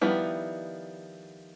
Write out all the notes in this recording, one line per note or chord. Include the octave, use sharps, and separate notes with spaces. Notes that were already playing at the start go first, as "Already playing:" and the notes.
D#3 F3 G3 B3 E4